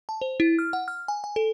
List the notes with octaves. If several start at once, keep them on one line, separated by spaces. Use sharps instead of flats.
A5
C5
E4
F6
F#5
F6
G#5
G#5
A4